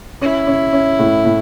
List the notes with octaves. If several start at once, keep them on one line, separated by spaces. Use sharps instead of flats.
C#4 E4
C#4
C#4
A2
A2